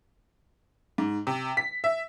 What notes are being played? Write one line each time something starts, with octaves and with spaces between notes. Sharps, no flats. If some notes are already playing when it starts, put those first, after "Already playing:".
G#2
C3
B6
E5